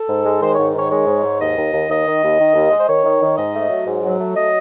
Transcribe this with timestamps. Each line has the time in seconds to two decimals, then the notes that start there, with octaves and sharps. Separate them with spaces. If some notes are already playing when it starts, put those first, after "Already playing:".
Already playing: A4
0.08 G#2
0.24 G#3
0.41 D#3 C5
0.54 G#2 C#5
0.74 D#3 C#5
0.90 G#3 C#5
1.07 G#2
1.23 G#2
1.40 D#2 D#5
1.56 D#2
1.73 D#2
1.89 D#2 D#5
2.06 D#3
2.22 D#2
2.39 D#3
2.55 D#2
2.71 G#3
2.79 C5
2.88 D#3 C#5
3.04 D#3
3.21 D#3
3.37 G#2 D#5
3.54 A3
3.70 F#3
3.87 G#2
4.03 F#3
4.19 A3
4.35 F#3 D#5